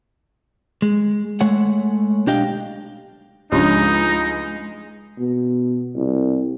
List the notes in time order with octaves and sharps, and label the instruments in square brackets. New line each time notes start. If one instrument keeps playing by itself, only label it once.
[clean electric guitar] G#3
G#3 A3 C#5 F#5
B1 D4 G4 D#5 F5 G5
[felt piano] C#2 [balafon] F3 D4 G4 [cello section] G#3 [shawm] D#4
[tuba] B2
C2